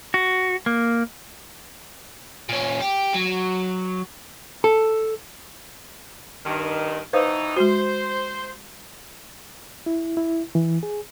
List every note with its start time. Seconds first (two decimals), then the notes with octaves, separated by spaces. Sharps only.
0.14 F#4
0.66 A#3
2.49 A#2 C#4
2.80 G4
3.14 F#3
4.64 A4
6.45 G2 D#3
7.13 B2 E3 D#4 B4 C5 F5
7.57 G#3 F#4 C5
9.86 E4
10.17 E4
10.55 E3
10.83 G#4